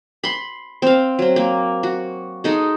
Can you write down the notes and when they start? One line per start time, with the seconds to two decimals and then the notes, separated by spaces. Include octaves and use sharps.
0.24 B5 C6
0.82 C4 F5
1.19 F#3 C4
1.36 A#3
1.83 F#4
2.44 G#3 D#4 A4